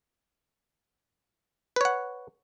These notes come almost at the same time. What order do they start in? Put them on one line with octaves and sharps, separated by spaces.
B4 C#5 F#5